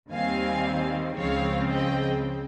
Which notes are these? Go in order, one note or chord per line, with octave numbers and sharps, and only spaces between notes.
D#2 D#3 G3 C4 F5 G#5
C#2 C#3 F3 G#3 C4 C#5 F5
D#5 G5